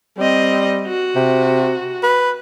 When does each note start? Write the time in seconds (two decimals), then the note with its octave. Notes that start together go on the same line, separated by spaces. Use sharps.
0.18 G3 C4 D#5
0.87 F#4
1.16 C3
2.03 B4